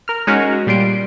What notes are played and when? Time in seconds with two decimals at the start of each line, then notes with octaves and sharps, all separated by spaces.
0.08 A#4 F6
0.27 G#3 C#4 D#4 F#4 A#4
0.67 A#2 G3 C6 D7